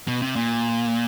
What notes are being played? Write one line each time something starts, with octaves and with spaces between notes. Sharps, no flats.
B2
C3
A#2